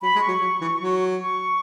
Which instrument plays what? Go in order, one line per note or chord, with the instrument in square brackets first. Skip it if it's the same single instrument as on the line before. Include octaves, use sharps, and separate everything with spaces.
[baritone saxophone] F#3 [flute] B5
[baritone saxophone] G#3
[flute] C#6
[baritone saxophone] F#3
F#3
E3
F#3
[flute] C#6